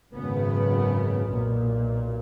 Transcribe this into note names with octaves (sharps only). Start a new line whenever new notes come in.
G#1 F#2 C#3 B3
B1 A#2